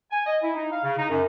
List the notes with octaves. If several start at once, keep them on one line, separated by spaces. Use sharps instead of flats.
G#5
D#5
E4
D#4
F5
C#3
D#4
F#2